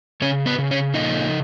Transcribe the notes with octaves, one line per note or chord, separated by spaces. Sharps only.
C#3 C#4 C#5
B3 B4
C#3
C#4 C#5
A#2 D#4 D#5